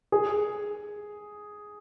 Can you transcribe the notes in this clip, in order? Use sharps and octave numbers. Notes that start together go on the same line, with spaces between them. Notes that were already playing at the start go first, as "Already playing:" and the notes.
G#4